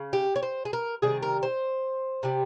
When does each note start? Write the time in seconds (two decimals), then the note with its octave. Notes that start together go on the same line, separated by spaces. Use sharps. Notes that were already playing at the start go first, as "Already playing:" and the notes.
Already playing: C#3
0.13 G4
0.36 C#5
0.43 C5
0.65 G#4
0.73 A#4
1.02 C3 D#3 G3 G#4
1.22 A#4
1.43 C5
2.23 C3 G3